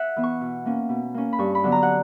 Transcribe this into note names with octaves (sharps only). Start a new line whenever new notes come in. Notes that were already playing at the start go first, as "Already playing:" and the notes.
Already playing: E5 F#5
E3 B3
C#6
B2
A#3 C#4
B2
A#3 C#4
B5
G2 C#6
B5
D3 F#3 B3
A#5
F#5